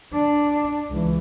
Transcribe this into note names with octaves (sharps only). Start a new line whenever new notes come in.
D4
C#2 E3